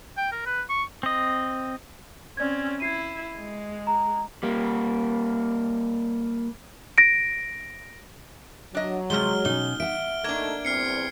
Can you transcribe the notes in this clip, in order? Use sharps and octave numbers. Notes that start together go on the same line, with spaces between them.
G5
A#4
B4
C#6
C4 D#5
C4 C#4 D5 G#6
E4 G#6 C7 D#7
G#3
A#5
G3 A#3
A#6 D7
F#3 D4 D#5
C3 D#3 F3 G#3 F6 G7
B2 C#4 D#4 G7
E5 F#5 D7
A3 A#3 D4 D#4 G#6
E2 G2 C4 F6 C7 C#7